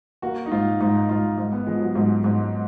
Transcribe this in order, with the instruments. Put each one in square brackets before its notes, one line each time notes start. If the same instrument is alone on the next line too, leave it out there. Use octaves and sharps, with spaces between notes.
[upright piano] A#3 [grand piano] F#4
[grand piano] D#4
[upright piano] G#2 [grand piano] F4
[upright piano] G#2 [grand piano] D#4
[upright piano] G#2 [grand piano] F4
[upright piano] G#2
[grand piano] B3
[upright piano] F3 [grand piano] G#3
[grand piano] F#3
[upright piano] G#2 [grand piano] F#3
[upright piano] G#2 [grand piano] G#3